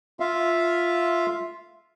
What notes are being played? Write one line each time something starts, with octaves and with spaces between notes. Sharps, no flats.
F4 E5 F5